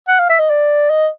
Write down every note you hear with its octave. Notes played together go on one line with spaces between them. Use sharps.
F#5
F5
E5
D#5
D5
D#5